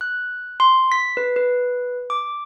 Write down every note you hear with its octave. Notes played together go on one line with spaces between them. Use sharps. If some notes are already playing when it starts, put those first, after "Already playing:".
F#6
C6
B6
B4
B4
D6